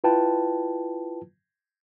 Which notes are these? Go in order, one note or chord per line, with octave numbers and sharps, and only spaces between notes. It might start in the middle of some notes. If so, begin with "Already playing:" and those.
E4 F4 B4 G5 A5